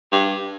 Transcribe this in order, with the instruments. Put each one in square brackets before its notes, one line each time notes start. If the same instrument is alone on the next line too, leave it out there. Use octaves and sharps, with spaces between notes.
[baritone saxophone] G2